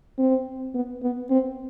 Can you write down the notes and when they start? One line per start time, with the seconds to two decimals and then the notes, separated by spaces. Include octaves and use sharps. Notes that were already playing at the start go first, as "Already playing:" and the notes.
0.18 C4
0.74 B3
1.03 B3
1.30 C4